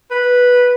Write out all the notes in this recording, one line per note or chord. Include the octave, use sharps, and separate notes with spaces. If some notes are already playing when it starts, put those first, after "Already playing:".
B4